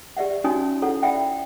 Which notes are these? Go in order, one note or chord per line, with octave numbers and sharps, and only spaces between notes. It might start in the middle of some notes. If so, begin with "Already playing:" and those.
G4 D5 E5 F#5
C#4 D#4 F#4 C#5 G#5 D#6
E4 A4 C#5 F#5
D5 E5 F#5 G5 B5